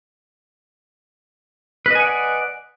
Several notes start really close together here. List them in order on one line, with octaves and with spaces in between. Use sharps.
B4 D#5 G#5 F#5 D5